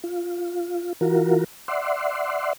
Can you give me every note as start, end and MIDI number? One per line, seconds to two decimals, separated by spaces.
0.04 0.93 65
1.01 1.44 52
1.01 1.44 65
1.01 1.44 66
1.01 1.44 70
1.68 2.53 74
1.68 2.53 76
1.68 2.53 78
1.68 2.53 84